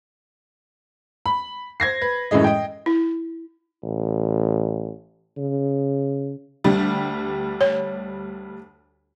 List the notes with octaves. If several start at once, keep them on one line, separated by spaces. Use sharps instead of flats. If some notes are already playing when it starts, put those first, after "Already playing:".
B5
C5 G#6 A#6 C7
B4
F#2 A2 E3 G#3 D#5
D#5 G5
E4
A1
C#3
D2 G3
C#5